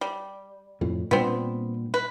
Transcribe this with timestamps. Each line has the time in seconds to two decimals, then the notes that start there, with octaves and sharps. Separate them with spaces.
0.01 G3
0.81 F2 A2
1.11 A#2 G3 B3 C4 D4
1.94 B4